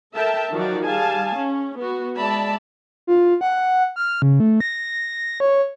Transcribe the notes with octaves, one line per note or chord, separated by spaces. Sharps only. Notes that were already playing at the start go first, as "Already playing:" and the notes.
A4 A#4 E5 G5 A5
D#3 F3 F#3 F4 F#4 D5
G3 G#4 F5 G#5 A5
C#4
B3 F#4
G#3 D5 E5 A5 B5
F4
F#5
F6
C#3
A3
A#6
C#5